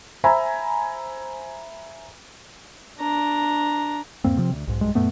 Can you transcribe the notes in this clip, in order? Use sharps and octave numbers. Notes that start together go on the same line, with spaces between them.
C5 E5 G#5 A#5 B5
D4 A#5
E2 G#2 A#3 C4
C3 F3 C4
D2
B1 G#2
B1 G2 G#3
F#2 A#2 A3 B3